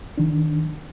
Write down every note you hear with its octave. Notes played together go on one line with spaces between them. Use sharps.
D#3 D4